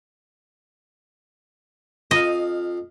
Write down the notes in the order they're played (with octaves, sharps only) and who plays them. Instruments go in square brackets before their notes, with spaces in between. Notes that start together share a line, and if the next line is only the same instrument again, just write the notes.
[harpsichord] F2 F5 [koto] D#5